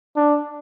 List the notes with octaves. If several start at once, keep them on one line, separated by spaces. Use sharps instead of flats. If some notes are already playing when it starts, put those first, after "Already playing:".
D4